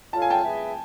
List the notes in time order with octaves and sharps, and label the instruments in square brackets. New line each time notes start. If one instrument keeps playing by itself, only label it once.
[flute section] F4 A4 C#5 F5 [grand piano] A5
[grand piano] G#5
G5 A5
[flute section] G#4 B4 E5